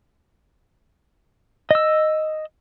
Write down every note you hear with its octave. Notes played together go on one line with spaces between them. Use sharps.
D#5 E6